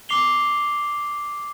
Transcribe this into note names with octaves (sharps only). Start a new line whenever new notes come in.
D6 C7 F7 G7